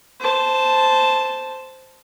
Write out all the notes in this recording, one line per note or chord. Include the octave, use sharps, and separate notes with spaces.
C5 A5